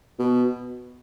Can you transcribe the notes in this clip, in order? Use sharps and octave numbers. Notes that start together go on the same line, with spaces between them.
B2